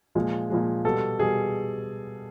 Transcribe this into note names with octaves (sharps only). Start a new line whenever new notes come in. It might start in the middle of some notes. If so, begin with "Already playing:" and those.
A#2 F3 G#3
A#2 F3 G#3
B2 G3 A4
B2 G3 G#4